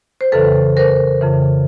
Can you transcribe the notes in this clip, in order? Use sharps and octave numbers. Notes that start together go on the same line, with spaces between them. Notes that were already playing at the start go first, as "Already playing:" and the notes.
C5
F2 C#3 E3 A4 B4
A#4 C5
F2 C#3 E3